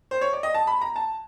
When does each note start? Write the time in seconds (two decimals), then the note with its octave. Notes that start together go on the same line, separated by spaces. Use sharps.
0.11 C5
0.21 C#5
0.33 D5
0.43 D#5
0.54 A5
0.67 B5
0.81 A#5
0.96 A5